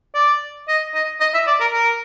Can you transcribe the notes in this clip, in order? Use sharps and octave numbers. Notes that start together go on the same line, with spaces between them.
D5
D#5
D#5
D#5
E5
D5
A#4
A#4